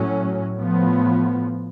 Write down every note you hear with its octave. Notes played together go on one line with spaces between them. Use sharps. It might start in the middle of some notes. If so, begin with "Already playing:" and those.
Already playing: A2 F#3 C#4
A2 F3 B3